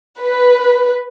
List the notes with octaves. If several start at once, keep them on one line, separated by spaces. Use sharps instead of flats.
B4